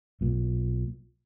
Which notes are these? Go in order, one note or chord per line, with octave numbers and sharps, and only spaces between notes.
B1 A#2